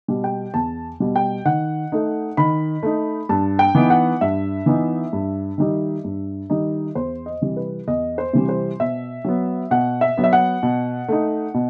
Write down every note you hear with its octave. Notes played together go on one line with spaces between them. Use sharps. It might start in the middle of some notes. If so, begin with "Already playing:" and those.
B2 G3
G5
E2 A5
B2 G3
G5
D#3 F#5
A3 D#4
D#3 B5
A3 D#4
G2 A5
G5
E3 B3 D#4
F#5
G2 E5
E3 B3 D#4
G2
D#3 G3 D#4
G2
D#3 G3 D#4
E2 C5
D#5
C3 E3 G3
B4
E2 D#5
C5
C3 E3 G3
C5
B2 E5
F#3 B3
B2 F#5
E5
F#3 B3
E5
F#5
B2
A3 D#4
B2